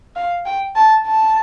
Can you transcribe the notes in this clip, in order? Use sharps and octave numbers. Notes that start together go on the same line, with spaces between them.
F5
G5
A5
A5